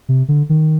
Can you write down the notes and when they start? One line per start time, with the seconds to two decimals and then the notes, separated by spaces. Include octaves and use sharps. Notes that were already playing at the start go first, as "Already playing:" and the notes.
0.09 C3
0.28 D3
0.49 D#3